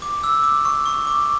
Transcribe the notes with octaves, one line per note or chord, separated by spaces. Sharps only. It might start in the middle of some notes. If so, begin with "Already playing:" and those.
D6
E6
D6
C#6
C#6
D6